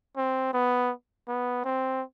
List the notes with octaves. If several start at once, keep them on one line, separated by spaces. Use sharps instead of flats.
C4
B3
B3
C4